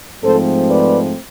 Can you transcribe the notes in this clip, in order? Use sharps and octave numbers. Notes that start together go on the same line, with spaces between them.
G#2 F3 A3 C4 A4 C5
B4 D5